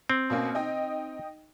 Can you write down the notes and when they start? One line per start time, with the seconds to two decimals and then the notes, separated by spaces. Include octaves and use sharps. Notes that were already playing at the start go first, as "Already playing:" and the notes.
0.10 C4
0.30 B2 A#3 C#4
0.55 D#4 D#5 G5